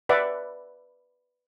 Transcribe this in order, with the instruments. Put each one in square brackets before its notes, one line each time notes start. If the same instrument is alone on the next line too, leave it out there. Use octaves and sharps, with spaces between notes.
[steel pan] B4 D5 E5 F#5